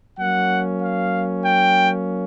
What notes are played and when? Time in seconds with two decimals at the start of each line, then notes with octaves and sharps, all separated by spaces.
0.18 F#3 A#3 C#4 F#5
0.81 F5
1.43 G5